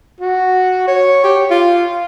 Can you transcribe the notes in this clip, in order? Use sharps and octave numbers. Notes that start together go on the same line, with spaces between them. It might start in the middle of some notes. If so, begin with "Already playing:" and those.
F#4
C#5
G4
F4